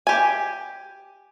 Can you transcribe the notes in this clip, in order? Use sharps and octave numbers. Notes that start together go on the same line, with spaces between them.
G4 G#5